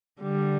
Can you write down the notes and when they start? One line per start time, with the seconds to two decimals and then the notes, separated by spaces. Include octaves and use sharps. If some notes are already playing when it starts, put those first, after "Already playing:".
0.21 D3 G3